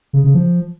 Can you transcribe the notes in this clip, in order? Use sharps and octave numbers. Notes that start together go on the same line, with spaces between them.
C#3
C#3
F3